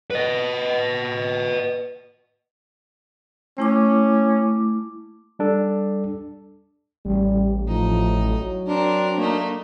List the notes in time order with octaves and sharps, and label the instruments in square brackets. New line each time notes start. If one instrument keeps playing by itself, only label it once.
[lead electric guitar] B4 D#5
[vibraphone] A3 E4 D6 [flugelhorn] C#4
[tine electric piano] G3 D4 A4
[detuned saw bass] A1 [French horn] G3
[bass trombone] A2 [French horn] F3 [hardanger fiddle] D#4
[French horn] F#3
[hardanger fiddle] C4 A#4 [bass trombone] D4
[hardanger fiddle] A3 D#4 [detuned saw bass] A#3 [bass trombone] D4